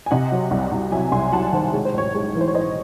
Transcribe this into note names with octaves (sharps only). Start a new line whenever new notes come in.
G#5
C3 D#5 F#5
F#3
C2
C2
F#3 E5 G#5
C2 G#5 C6
F#3 F#5 A5
D#3 C5
G#3 C#5
C5
A1 C#5
G#3 C#5
E3
C5
C#5
E3 C5 D#5